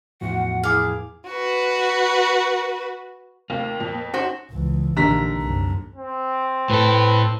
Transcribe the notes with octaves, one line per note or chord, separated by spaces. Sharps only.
E2 A2 F3 F#4 F#5
E4 G#4 F5 D6
F#4 B4
D#2 C3 A3 A#3 C4 F4
F2 A#2
C#4 D#4 F#4 C5
C#2 E3
A#1 D#2 D3 A#5 B6
C2 F#2
C4
A2 A4 B4